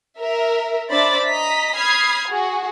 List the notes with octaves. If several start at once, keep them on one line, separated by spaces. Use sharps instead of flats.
A#4 E5
D4 C5 D5 E5 B5 A6
D#5 A#5 B6
B5 D#6 F6 G#6 C7
F#4 G#4